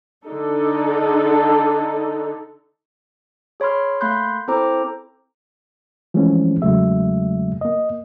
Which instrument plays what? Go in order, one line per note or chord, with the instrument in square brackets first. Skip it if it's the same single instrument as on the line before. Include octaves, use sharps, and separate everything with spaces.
[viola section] D3 D4 D#4 A4
[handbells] G#4 C#5 B5 C6 F6
A3 A#3 B5 C6 F#6 G6
C4 E4 A4 C5 A#5 D6
[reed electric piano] E3 F3 G#3 A3 C4 C#4
E2 C#3 F#3 G#3 A3 E5
A#3 D#5